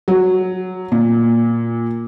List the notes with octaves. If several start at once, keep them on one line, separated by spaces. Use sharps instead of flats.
F#3
A#2